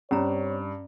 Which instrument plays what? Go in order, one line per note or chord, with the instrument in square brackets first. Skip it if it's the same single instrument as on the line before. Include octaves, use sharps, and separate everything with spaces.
[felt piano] G2 [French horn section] C4 C#5 D5 [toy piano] C#4 A#5